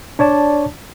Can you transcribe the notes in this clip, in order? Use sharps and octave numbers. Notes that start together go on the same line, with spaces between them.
D4 C#5 D5 A5